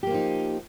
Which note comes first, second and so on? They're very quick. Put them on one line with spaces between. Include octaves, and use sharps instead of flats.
G4 A#3 F3 D#4